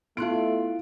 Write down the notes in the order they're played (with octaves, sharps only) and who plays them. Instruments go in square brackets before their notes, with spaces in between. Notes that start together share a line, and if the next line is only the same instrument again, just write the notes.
[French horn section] A3 [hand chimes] B3 C6 F#6 [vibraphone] E4 [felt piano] F4 D7